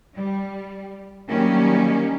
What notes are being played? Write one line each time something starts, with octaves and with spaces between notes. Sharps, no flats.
G3
D#3 F#3 G3 A#3 C#4 G4